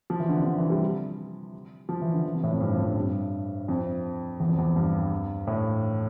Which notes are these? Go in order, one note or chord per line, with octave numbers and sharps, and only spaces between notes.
F3
E3
D3
C3
D3
E3
G3
F3
E3
D3
E3
C3
A2
F2
G2
F2
G2
G2
F2
E2
F2
E2
G2
A2